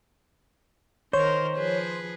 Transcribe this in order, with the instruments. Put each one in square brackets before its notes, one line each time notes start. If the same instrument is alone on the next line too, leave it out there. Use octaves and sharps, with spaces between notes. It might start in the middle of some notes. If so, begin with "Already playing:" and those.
[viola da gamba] D#3 A#4 [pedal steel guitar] C5 [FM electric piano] C#5
[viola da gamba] F3 G#4 B4